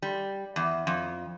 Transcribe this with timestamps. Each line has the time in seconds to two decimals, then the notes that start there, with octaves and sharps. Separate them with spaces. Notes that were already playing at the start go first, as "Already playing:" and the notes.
0.02 G3
0.56 E2
0.87 F2